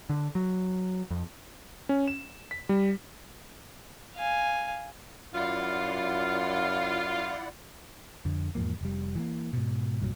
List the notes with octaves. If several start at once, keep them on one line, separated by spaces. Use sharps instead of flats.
D3
F#3
F2
C#4
E7
B6
G3
F5 G#5
F#2 E4 F4 D5 F#5
F2 D3
E2 G#2 F3 A#3
F1 G3
E3 G#3 A#3
G#2 B2
C2 G2 A#2 F#3